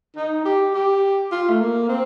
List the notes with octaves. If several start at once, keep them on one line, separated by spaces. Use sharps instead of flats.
D#4
G4
G4
F4
A3
A#3
C4